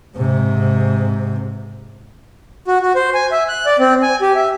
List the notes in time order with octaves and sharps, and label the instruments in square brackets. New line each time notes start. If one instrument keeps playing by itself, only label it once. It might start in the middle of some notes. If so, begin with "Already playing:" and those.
[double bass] G#2 C3
[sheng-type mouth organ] F#4
F#4
C5
G#5
E5
F#6
D5
C4
G#5
G4
E5